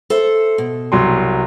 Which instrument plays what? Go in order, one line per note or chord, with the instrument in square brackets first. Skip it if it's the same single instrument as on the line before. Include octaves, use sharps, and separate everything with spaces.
[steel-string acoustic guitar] A4 C5 E5
B2
[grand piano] C2 F#3 C6